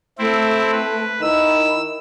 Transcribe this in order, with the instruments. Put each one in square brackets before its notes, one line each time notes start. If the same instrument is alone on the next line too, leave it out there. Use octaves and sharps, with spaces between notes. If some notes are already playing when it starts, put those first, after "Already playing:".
[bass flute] A3 [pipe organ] C4 E4
[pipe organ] B4
[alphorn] D#3 [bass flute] E4 [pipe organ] E6